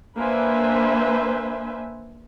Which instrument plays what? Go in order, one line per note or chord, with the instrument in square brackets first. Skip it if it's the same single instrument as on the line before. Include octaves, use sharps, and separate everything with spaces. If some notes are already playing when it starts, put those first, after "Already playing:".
[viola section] A#3 D4 B4 C5 E5 G#5